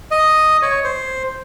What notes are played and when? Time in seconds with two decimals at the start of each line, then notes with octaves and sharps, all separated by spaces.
0.11 D#5
0.62 C#5
0.84 C5